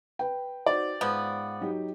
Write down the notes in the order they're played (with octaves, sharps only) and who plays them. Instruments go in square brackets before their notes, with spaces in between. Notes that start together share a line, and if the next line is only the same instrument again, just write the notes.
[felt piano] B4 G5
[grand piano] D#4 F#4 C5 [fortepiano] D5
[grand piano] G#2 [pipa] F3 B3
[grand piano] F#3 D#4 G4